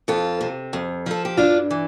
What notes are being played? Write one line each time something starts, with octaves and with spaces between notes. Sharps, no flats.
F2 F4 A4
C3
F2
F3 A4
G4
G2 D4 F4
E3